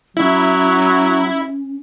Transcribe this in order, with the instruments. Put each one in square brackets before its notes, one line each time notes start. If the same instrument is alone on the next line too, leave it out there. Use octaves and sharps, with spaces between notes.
[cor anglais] F#3 [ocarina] C#4 [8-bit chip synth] E4